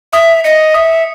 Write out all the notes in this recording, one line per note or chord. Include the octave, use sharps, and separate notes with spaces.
E5 D#6
D#5 C#7
E5 D#6